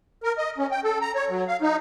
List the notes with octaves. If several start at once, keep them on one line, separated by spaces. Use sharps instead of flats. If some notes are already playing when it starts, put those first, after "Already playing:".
A#4
D#5
C#4
G5
A4
A#5
C#5
F#3
F5
D#4